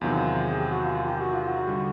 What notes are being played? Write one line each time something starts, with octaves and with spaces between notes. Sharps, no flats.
E2 C3 D#3 F#3 F4
G#4
G4
F#4
F4
G4
F#4
F4
F#4
D3 G3